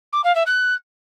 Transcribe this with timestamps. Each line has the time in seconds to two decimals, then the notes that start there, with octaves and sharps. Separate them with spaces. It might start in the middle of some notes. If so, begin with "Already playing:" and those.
0.13 D6
0.24 F5
0.35 E5
0.47 F#6